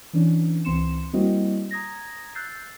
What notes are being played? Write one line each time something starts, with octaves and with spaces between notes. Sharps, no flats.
E3 C#4 D4
C#2 E3 C4 C6 C#7 E7
G3 A#3 C4 E4 F#4 D#5
A#5 D#6 G#6 A#6
E6 F#6 G6 A6 C7